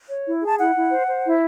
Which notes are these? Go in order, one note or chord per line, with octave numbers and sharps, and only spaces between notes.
C#5
E4
G#4 A5
E4 F#5
E4
C5
C5
E4